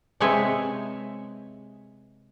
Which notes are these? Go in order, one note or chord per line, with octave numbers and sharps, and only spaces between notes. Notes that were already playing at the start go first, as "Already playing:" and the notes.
C3 G#3 B4 C#5 E5 G#5